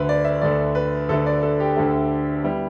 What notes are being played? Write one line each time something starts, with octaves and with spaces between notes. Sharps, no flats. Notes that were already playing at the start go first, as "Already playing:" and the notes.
Already playing: D2 D3 A3 B4
D5
E5
D2 D3 A3 D5
B4
D2 D3 A3 A4
D5
A4
G4
D2 D3 A3
G3 B3 E4